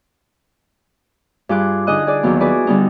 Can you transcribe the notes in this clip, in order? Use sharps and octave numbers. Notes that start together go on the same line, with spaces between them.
G2 F4 G#4 D6 F#6
D3 D#4 G#4 D#5 D#6 F#6
G#4 D5
D#2 D#3 F#3 B3
E4 F#4 G#4 B4 D5
D3 G3 B3 D#4